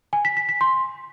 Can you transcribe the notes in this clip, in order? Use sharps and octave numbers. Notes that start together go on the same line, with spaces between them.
G#5
B6
B6
B6
C6